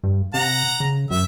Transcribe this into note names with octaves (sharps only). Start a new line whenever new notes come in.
G2
C3 F#5 A#5
C#3
F#2 E5